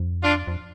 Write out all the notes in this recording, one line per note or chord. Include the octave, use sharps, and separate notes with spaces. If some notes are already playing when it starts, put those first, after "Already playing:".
Already playing: F2
D4 F4
F2